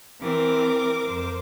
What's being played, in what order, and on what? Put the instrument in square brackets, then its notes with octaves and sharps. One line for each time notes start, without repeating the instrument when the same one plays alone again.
[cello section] E3 C4 [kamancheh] A#4 D6
[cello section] F2 C5